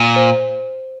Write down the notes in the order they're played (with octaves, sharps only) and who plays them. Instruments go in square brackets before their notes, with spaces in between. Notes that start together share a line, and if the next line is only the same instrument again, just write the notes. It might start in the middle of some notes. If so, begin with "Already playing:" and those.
Already playing: [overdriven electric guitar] A#2
[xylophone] C5